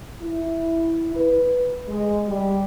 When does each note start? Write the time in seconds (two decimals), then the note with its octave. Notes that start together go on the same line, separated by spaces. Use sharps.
0.21 E4
1.15 B4
1.88 G#3
2.27 G3